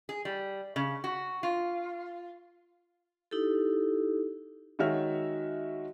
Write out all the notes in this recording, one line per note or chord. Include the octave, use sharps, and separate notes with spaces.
G#4
G3
C#3
F#4
F4
D#4 E4 G4 A4
D#3 G#3 F#4 C#5 E5 F6